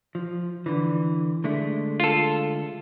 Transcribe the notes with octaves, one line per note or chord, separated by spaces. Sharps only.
F3
D3 E3
D3 G#3 A3
F4 A4